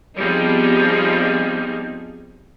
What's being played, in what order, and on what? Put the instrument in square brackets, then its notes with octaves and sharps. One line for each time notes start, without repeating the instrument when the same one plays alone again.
[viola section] F3 G3 B3 C4 D#4 G#4